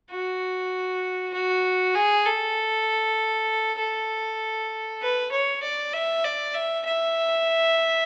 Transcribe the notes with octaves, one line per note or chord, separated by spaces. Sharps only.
F#4
F#4
G#4
A4
A4
B4
C#5
D5
E5
D5
E5
E5